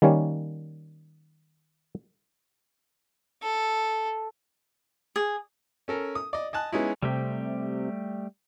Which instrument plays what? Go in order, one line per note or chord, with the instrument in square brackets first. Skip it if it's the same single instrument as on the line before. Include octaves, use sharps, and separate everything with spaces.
[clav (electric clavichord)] D#3 G3 A#3 C#4 C#5
[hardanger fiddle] A4
[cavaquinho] G#4
[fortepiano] C#4 A4 A#4
D#6
D5 D#5
D#5 G#5 A5 F#6
G#3 B3 C#4 D#4 E4
[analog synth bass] C3 [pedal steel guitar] G3 A3 G4